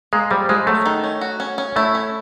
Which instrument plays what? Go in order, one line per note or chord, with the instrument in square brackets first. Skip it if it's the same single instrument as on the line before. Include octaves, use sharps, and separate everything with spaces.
[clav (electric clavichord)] G#3 [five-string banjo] A#3
[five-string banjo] F3 [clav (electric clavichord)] G3
[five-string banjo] F3 [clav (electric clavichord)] G#3
[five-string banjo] F#3 [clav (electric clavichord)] A3
[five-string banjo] D#3
C#4
F#4
C#4
C#4
[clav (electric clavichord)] A3 [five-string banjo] E4
[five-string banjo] C#4